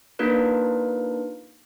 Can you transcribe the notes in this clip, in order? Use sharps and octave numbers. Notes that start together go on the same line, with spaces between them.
A#3 D4 D#4 F4 A#4 B4